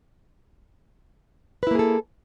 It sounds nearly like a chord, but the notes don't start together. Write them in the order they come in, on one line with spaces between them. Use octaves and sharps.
B4 E4 A#3 G#4 A4